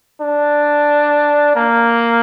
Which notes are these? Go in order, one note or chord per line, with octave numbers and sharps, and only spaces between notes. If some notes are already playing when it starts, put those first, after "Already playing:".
D4
A#3